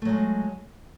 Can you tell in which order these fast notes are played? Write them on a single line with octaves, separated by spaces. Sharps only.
A3 F#3 G#3